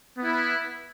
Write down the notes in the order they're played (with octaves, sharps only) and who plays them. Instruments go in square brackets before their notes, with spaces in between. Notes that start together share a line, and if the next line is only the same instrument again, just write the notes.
[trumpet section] B3
E4